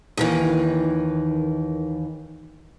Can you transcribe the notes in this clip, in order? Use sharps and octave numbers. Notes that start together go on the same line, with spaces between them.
D#2 D#3 E3